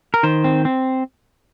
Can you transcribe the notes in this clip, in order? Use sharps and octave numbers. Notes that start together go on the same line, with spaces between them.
A#4
D#3 C5
C4
C4